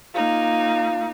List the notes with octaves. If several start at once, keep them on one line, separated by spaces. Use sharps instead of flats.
A#3 D#4 F4